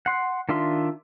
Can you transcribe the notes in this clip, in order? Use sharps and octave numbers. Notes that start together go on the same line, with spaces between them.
F#5 C6
D#3 D4 F4 E5 C6